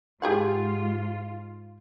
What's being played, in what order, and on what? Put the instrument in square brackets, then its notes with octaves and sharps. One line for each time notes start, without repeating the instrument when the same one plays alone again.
[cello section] G#2 F4 [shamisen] G4 G#4 F#5